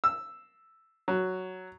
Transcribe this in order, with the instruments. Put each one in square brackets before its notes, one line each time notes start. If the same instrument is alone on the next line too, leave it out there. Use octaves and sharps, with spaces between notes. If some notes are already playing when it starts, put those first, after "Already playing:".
[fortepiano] E6
F#3